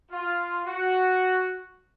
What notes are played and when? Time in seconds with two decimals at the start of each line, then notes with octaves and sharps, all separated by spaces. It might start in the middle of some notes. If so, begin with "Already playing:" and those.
0.11 F4
0.66 F#4